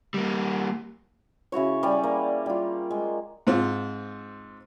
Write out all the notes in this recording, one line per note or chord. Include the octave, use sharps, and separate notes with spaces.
G3 A#3
C#3 E4 F#4 C#5
G3 D5 G#5
A#3
G3 F4
G#3
G#2 C4 F4